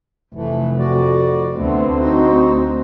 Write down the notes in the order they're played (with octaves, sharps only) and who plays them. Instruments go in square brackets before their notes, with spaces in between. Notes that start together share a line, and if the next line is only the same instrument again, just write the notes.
[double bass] F1 [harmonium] E3 A3
[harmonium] F2 F#4 D5
[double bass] D2 C4 [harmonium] D3 A3 B3
[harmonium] D#4 F#4